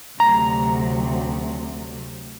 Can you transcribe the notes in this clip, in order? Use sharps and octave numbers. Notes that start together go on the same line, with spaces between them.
D2 C3 F#3 A#5